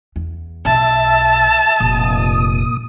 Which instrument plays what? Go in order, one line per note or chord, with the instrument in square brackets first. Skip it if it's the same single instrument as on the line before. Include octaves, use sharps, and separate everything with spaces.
[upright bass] E2
[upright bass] B1 [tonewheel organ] E5 [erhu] A5
[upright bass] F1 [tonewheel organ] A#2 D#6